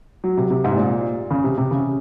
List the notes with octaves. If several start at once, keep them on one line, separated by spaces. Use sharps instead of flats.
F#3
C3
C3
G#2
C3
A#2
C#3
C3
C3
C#3